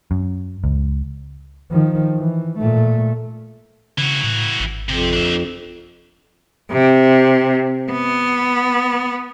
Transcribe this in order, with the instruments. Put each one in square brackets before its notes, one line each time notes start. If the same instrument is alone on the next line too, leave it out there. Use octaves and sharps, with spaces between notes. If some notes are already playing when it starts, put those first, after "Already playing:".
[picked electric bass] F#2
C#2
[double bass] D#3 F3
E3
A#2 A3
[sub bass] C#3 [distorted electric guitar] E3 F#4
[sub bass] A2
G#1
[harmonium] F2 [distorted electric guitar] C3
[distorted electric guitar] D4 E5
[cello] C3
B3